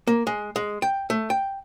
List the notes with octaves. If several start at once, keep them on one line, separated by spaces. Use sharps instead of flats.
A#3
G#3
G#3
G5
A3
G5